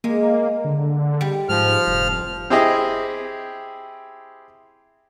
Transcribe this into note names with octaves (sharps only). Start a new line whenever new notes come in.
G#3 A#3
D3
G3
G#2 F3 F6
F1
C4 E4 G4 G#4 D#5